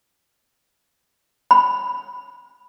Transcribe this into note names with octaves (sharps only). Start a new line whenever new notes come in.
B5